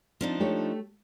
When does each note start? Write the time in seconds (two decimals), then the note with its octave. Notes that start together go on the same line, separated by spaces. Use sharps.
0.21 F3 C4 D4 D#4
0.40 A3 G4 C#5